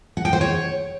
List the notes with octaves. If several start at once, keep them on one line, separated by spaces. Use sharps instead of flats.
F#5
G5
C5
C#5